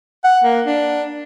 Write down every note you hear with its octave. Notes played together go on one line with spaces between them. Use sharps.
F#5
A#3
D4